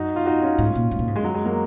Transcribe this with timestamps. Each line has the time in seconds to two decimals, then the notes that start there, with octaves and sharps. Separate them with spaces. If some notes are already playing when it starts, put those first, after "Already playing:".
Already playing: F#2 D#4 F#4
0.16 F4
0.26 D#4 F#4
0.42 C#4 F4
0.58 G#2
0.75 A#2
0.91 G#2
0.99 A#2
1.08 G#2
1.16 F#2 G#3
1.24 F#3
1.34 G#3
1.45 F#3 A#3